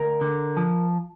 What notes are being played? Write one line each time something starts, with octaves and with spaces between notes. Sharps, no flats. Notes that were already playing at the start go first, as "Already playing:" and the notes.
Already playing: D2 A#4
D3
F3